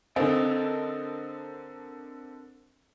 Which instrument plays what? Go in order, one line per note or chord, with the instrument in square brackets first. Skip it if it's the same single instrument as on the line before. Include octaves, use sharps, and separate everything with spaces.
[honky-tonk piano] D3 C4 [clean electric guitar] A4 A#4 D#5